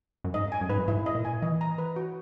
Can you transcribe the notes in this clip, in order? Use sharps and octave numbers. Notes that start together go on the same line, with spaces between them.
F#2
G#2 D#5
G#5
F#2
G#2 B4
F#2
G#2 E4
D#5
A#2
G#5
E3 D#5
A#5
B4
F#4